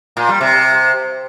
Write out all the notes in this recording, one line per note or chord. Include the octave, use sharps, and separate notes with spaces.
A#2
G3
C3